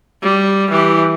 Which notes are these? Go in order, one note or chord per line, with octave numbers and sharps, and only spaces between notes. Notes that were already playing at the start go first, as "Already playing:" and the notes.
G3
E3 G4